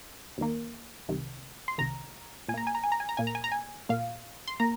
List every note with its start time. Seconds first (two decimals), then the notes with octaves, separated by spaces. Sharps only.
0.38 D#2 D#3 A#3
1.09 C2 C3 D#3
1.68 C6
1.78 C2 C3 D#3 A#5
2.48 A#2 G#5
2.54 A#3 A#5
2.67 G#5
2.75 A#5
2.84 G#5
2.92 A#5
3.00 G#5
3.09 A#5
3.17 A#2 A#3 G#5
3.27 A#5
3.35 G#5
3.44 A#5
3.52 G#5
3.89 A#2 A#3 F5
4.48 C6
4.60 A#3 A#5